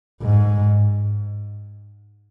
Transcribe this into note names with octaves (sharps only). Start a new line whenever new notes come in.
G#2